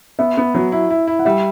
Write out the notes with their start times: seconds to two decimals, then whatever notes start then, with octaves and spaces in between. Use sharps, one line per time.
0.19 B3 E5
0.37 B3
0.54 F#3
0.72 E4
0.90 E4
1.07 E4
1.19 F#5
1.25 G3 E5